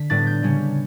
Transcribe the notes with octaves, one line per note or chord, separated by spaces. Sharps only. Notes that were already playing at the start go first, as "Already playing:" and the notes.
Already playing: D3 B6
A2 G3 B3 D4 A6
G6
C#3 G3 C#4